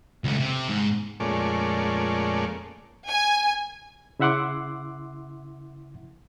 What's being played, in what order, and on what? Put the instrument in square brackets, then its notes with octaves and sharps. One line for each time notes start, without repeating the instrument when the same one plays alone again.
[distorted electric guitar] C#2 A3
C3
G#2
[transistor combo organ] F2 A#2 G#3 A3 C#4 D5
[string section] G#5
[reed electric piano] C#3 E4 E5 F#5 C6 D6